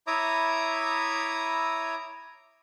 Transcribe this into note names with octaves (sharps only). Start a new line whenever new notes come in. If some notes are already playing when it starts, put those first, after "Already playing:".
E4 C#5 E5 A#5 D6 D#6